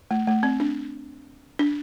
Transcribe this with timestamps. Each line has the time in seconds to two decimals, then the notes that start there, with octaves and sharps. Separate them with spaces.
0.11 A3
0.27 A3
0.43 C4
0.60 D4
1.59 D4